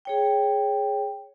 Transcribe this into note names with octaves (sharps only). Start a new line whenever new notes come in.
G#4 C#5 G5